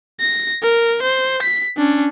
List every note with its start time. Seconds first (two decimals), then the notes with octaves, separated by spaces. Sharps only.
0.21 A#6
0.62 A#4
1.02 C5
1.42 B6
1.77 C#4 D4